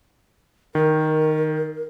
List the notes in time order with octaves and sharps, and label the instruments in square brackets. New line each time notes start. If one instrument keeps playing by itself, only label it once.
[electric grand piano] D#3 [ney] A#4